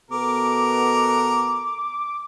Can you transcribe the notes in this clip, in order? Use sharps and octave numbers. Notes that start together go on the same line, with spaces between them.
B2 B3 A4 A#4 D6